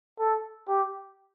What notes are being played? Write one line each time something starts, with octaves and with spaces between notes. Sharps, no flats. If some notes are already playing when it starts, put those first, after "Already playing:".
A4
G4